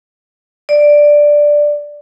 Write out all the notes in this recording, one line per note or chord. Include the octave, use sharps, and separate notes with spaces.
D5